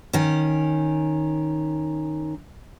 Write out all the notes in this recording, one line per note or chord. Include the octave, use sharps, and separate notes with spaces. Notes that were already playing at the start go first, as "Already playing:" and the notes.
D#3 C#4